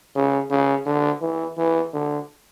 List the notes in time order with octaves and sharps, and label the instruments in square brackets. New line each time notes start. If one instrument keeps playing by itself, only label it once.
[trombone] C#3
C#3
D3
E3
E3
D3